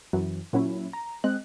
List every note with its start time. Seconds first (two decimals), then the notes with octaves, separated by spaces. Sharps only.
0.13 F#2 E3 F#3
0.53 A#2 F#3 C#4 E4
0.93 A#5
1.24 G#3 C4 D#5 F#6